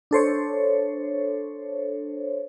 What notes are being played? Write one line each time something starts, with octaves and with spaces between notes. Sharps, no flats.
D4 A4 C5 C#5